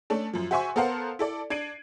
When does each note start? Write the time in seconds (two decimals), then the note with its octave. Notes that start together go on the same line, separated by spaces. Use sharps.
0.10 A3 C#4 D4 A4
0.33 F#2 F3
0.51 F#4 C5 E5 G#5 C6 C#6
0.76 B3 A4 A#4 C5 F5 F#5
1.19 E4 A4 D5
1.50 D4 G#6 C7 D7 D#7 F#7